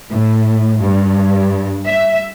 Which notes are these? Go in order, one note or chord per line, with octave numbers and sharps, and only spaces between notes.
A2
G2
E5